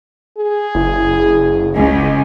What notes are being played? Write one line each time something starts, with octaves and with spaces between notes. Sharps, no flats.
G#4
F#1 E4
C#2 G#5